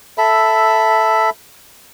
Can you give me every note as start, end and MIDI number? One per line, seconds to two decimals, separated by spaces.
0.18 1.30 69
0.18 1.30 76
0.18 1.30 83